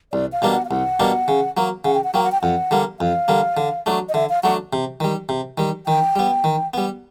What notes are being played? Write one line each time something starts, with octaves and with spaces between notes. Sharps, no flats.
C2 D5
F5
B2 G3 A#3 D4
F#5
F5
C2 F#5
B2 G3 A#3 D4
C#3
F#3 A#3
C#3 F#5
G5
F#5
F#3 A#3 G5
F#5
G5
F2 F#5
D3 G3 A#3
F2 F5
D3 G3 A#3
D3
F#3 A3 D4
D#5
D3 E5
F5
F#3 A3 D4 F#5
C3
D#3 G3
C3
D#3 G3
D#3 G5
G3 B3
D#3
G3 B3